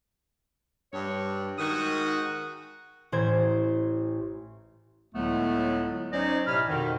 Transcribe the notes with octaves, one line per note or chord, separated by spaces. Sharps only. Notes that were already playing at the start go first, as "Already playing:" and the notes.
G2 C#5
G#2 D#3 F#4 D#6
A1 C5 G#6
C#2 A2 D3 F#3 A3 B3
F#3 C#4 D#4 C5 D5 D#5
A2 C3 G#5 B5 F6
F2 G#2 B2 D#3